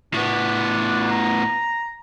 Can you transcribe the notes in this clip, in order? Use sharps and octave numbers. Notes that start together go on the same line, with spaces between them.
A2 B3 D4
A#5